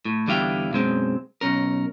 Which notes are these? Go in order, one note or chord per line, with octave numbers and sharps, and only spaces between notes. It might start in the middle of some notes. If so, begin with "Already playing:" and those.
A2
E2 D3 G3 E4 F5 G5
B1 F#2 G#3 C4
B1 C#4 A#4